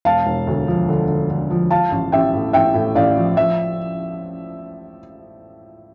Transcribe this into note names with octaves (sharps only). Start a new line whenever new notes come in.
E1 F5 A5
E1
D2
F3
D3
D3
D3
F3
F3 F5 A5
A1
A1 E5 G5
A2
A1 E5 G5
A2
A1 D5 F5
F3
F3 E5